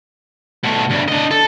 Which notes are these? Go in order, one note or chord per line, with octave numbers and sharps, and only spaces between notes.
B2 A3
D2 G2
D4 D#5
A4